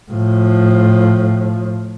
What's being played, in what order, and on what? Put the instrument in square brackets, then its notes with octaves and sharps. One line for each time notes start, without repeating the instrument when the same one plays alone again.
[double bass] A2 F3